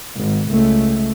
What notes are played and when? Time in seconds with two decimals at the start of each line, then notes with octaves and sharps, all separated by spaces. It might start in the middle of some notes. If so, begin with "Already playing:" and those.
0.16 G#1
0.49 C#2 A3